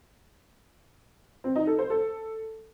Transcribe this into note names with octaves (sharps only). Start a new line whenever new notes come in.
C4
D#4
A4
C5
A4